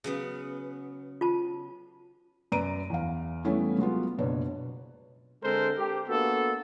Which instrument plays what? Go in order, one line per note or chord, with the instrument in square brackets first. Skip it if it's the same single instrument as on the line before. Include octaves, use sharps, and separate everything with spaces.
[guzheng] C#3 F#3 B3
[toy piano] F4 A5
[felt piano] F#2 B4 D5 A#5 D7 D#7
E2 F5
E3 G3 A3 B3 C#4 E4
F#3 G#3 B3 F4
F#1 B2 D4 B4 C#5
[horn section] D3 G#3 C4 A4 A#4 C5
G4
A#3 B3 D4 F#4 A4